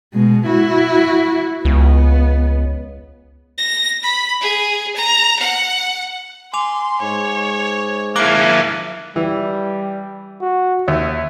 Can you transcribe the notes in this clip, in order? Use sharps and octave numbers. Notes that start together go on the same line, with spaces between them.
B2 G#3
E4 F#4
C#2 B3
A#6
B5
G#4
A#5
F#5
G#5 C6 D6 F7
G#2 C#5
A#3 E4 F5 F#6 G#6 D7
E3 G3
F#4
D#2 E5